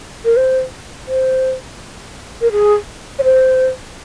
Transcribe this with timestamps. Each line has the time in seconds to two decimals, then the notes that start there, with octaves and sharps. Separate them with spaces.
0.25 A#4
0.37 C5
1.08 C5
2.41 A#4
2.52 G#4
3.19 C#5
3.24 C5